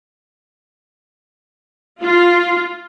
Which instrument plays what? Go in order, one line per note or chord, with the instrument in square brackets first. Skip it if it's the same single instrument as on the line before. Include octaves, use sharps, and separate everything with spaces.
[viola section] F4